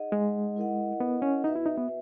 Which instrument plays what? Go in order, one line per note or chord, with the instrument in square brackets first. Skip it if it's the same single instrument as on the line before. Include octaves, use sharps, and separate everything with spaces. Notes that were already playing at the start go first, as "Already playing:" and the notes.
Already playing: [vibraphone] D#4 G#4 D#5 F#5
[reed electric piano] G#3
[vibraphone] E4 A#4 D#5 F#5
[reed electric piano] B3
C#4
[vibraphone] B3 F#4 B4 E5 [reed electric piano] D#4
[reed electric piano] E4
D#4
B3